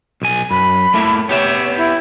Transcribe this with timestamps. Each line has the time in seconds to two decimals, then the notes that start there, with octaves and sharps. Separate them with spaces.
0.22 B1 G#5
0.51 F#2 B5
0.94 A3 A#3 E4
1.29 B3 G4 C#5 E5
1.77 E4